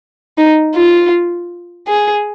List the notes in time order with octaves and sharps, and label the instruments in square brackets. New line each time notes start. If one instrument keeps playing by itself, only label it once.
[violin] D#4
F4
G#4